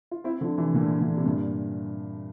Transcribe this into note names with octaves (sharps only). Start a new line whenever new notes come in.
F4
C4 E4
D3 F3
C3 E3
A#2 D3
A#2 D3
C3
G2 A#2